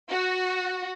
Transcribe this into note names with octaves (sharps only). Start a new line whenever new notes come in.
F#4